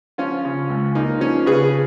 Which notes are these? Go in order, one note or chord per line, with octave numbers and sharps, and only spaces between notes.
F3 C#4 F4
C#3
C#2
A#3 D#4
F3 C#4
C#3 G#4 B4